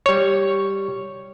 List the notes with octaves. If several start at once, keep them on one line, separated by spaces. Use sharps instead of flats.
G3 C#5